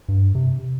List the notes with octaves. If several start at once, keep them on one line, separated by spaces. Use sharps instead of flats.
G2
C3